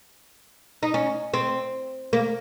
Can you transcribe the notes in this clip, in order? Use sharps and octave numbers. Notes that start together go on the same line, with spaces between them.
D#4
C#4
C4
A#3